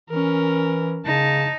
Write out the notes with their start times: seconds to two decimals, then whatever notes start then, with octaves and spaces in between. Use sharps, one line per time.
0.10 E3 C#4 A#4
1.06 C#3 D#4 A5